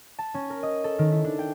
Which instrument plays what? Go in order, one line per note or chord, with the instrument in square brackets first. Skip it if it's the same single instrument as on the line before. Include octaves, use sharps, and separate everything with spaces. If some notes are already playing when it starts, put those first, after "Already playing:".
[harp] A5
C#4
A#4
D#5
A4
D#3
E4
D4
G5